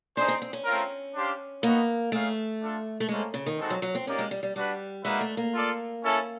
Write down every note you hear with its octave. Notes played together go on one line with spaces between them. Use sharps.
D4 D#4 G#4 C5
C4
C4
C#4
A3 C4 F4 A#4
D4 G4 C5 F5
A#3 B3 D#4 F#4
A3 D#4 G#4 C#5 F5
D4 F4 A4
A3
G#3 A#3 C#4 E4 A4 C5
C#3
D#3
G#3 C4 D#4 F#4 A4
F#3
F#3
C4
A#3 C#4 D#4 G4 A#4 D5
G#3
G3
G3
G3 D4 F#4 B4
G#3 A#3 D#4 F#4 B4 E5
A3
A#3
F4 A4 D5
C#4 E4 A4